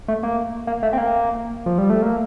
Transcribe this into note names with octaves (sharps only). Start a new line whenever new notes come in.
A3
A#3
A#3
A3
C4
A#3
F3
G3
A3
A#3